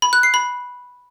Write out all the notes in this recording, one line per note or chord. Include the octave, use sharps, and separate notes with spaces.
B5
F#6
C7
B5